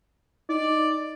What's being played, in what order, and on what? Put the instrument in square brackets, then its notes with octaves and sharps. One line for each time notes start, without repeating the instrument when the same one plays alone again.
[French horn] D#4 [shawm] D5